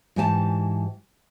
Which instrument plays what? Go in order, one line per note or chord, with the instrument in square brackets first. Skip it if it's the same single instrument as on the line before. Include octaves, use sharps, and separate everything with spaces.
[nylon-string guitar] G#2 E3 G4 G#5 A5